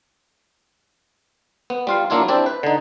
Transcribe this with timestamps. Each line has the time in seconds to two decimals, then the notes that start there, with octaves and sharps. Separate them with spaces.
1.70 B3
1.87 G3 F4 F5
2.10 F#3 A#3 D4 E4 F4
2.28 C4 D4 E4 G4 D5
2.46 B4
2.63 D3 D#4